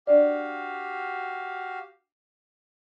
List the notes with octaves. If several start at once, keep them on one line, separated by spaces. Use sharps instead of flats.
D4 F#4 G4 D5 F5